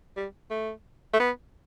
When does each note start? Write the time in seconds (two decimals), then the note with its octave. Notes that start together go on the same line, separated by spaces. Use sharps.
0.16 G3
0.50 A3
1.13 A3
1.20 B3